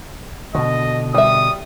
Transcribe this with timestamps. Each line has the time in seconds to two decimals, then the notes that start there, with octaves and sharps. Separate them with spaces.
0.55 B2 D3 F#4 D#5
1.14 G3 E5 D#6